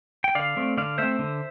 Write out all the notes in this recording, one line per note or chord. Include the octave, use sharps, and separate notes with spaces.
G5
D3 D5 F5
A3 C4
D3 D5 F5
A3 C4 C5 E5
D3